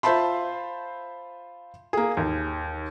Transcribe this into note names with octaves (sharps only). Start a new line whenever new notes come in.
F4 C5 E5 A5 B5 C6
A#3 G#4
D#2